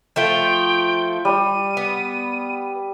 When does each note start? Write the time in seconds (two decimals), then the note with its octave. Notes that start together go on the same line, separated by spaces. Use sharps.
0.16 F3 A3 F4 G5
1.25 G3 D#7
1.77 B3